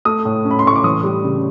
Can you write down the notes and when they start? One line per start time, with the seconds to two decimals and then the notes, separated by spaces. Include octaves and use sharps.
0.05 A3 D#6
0.25 A2
0.45 C#4
0.51 B5
0.59 C6
0.65 A2 C#6
0.76 D6
0.84 E3 D#6
1.03 G3
1.24 C#3